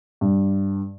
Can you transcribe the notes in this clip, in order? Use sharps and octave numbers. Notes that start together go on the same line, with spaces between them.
G2